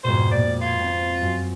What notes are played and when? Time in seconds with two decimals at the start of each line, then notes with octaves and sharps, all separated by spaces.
0.04 F2 G#2 B2 C5
0.31 A#2 A#3 D5
0.61 F4 C6 G#6 A6
0.80 C4
1.21 F#2